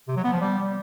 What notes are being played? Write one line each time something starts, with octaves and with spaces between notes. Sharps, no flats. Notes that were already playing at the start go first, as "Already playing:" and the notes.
C3
F#3
B3
F3
G3